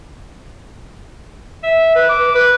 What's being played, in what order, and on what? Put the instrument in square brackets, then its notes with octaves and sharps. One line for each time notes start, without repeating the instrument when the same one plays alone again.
[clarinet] E5
B4
D6
B4